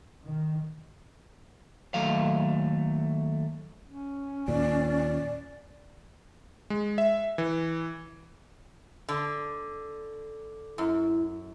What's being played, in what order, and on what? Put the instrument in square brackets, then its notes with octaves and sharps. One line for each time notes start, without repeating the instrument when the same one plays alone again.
[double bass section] D#3
[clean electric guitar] D#2 F#3 A3 F5
[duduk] C#4
[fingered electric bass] D#2 A#2 [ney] D5
[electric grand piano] G#3
E5
E3
[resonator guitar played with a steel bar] D3
[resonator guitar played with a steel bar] F#2 [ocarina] E4